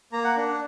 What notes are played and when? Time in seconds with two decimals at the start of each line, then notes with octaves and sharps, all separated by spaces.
0.12 A#3 A#5
0.24 F#5
0.37 D4